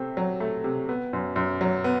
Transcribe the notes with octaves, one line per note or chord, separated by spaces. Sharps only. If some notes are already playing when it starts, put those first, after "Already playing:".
Already playing: C3 A3 C4
F#3
A3
C3
B3
F#2
F#2
F#3
B3